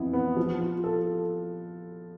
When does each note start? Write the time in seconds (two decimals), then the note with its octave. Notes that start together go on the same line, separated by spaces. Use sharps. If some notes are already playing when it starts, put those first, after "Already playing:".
Already playing: F2 E3 B3 E4
0.13 B3
0.37 F3
0.60 F4
0.84 A4